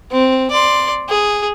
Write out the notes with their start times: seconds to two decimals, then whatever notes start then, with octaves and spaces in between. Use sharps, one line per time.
0.11 C4
0.51 D5 C6
1.09 G#4